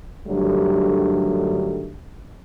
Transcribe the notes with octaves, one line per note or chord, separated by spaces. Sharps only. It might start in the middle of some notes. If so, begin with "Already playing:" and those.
G2 D3 D#3 F#3 G3 A3